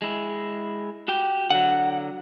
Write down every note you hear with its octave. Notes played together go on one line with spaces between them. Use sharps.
G#3 E4
F#4 G4 G5
D3 F#3 F#5